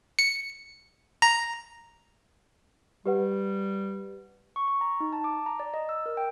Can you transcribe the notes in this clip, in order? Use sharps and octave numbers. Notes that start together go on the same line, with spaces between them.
C#7
A#5
G3 G4 B4 F#5
C#6
C#6
A#5
D#4
A5
D6
A#5
D5
D#5
E6
A#4
G5